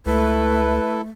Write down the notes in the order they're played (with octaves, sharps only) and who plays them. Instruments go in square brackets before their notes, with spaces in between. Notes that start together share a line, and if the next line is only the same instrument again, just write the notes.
[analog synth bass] C#2 [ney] A3 [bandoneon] E4 A4 [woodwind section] B4